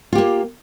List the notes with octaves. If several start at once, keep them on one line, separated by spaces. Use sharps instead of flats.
A#3 F4 G4